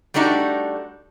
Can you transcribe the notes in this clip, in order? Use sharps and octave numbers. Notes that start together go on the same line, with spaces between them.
G3 A3 D4 D#4 F#4